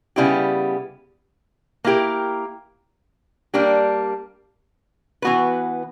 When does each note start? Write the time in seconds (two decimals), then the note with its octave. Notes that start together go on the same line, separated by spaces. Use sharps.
0.16 C#3 G3 B3 E4 G4
1.84 A#3 E4 G4 A#4
3.54 G3 A#3 D4 G4
5.22 E3 B3 F#4 B4